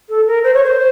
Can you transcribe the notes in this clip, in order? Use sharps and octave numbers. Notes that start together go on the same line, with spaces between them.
A4
A#4
C5
C#5
C5